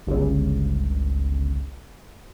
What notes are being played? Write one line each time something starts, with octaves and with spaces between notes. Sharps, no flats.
G1 C#2